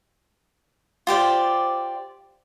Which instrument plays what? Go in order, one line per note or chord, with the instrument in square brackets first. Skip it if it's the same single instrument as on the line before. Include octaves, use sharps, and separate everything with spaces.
[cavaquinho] F4 G4 C5 D5